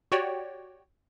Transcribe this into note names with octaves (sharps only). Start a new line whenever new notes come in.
F#4 G4 C#5 D5 G5